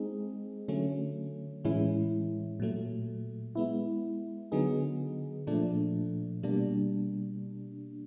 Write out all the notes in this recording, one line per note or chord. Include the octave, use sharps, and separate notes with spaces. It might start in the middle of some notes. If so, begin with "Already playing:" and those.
Already playing: G#3 C4 D#4 G#4
D3 F#3 A3 C#4
A2 E3 G#3 C#4 E4
A#2 F#3 A3
G#3 B3 E4
D3 F#3 B3 D#4 G#4
A#2 F3 A3 D4
B2 G3 A#3 D4